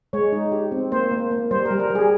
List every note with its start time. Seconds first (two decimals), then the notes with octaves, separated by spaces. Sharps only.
0.13 G#3 C#5
0.33 D#4
0.52 G4
0.72 C4
0.92 A#3 C5
1.11 A#3
1.31 A#3
1.51 G3 C5
1.65 G3 A#4
1.80 A#4
1.90 G3 G#4